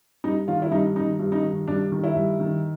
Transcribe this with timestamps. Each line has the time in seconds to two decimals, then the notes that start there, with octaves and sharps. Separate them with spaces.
0.24 G2 D#4
0.48 D#3 F4
0.62 E4
0.72 G2 D#4
0.96 D#3 D#4
1.19 G2
1.32 D#4
1.44 D#3
1.68 G2 D4
1.92 D#3
2.04 E4
2.15 G2
2.40 D#3